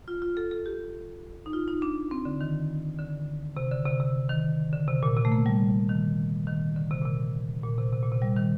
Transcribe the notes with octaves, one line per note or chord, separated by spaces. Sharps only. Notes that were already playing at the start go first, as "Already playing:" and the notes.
F4
F4
A4
A4
G4
D#4
F4
D#4
D4
C4
D3
D#3
D3
C3
D3
C3
C3
D#3
D3
C3
A#2
C3
A3
A#3
G3
D#3
D#3
D3
C3
A#2
C3
A#2
C3
C3
A#2
C3
G3
D#3